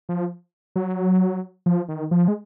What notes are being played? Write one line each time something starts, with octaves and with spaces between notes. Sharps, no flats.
F3
F#3
F3
D#3
F3
G#3